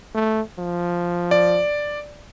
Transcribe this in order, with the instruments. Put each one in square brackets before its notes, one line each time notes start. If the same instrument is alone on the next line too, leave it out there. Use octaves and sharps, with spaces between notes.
[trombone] A3
F3
[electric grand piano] D5